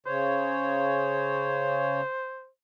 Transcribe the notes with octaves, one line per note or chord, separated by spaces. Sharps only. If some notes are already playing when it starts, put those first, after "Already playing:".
C#3 C5 C#5